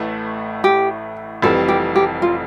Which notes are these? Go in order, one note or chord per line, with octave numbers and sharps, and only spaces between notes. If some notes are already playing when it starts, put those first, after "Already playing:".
Already playing: A1 A2 E3 A3 E4
G4
F1 F2 E3 G3 A4
G4
G4
F4